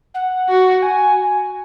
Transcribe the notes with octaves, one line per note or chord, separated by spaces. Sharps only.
F#5
F#4
G#5